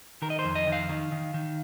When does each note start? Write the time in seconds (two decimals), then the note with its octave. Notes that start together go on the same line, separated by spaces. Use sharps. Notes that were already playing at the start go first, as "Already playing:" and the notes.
0.22 D#3 A#4
0.30 D#5
0.39 C5
0.45 F2
0.55 D#5
0.67 D#3
0.72 F5
0.89 D#3
1.12 D#3
1.34 D#3